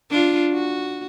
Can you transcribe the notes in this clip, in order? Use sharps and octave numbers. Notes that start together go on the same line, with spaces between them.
D4 F4
F#4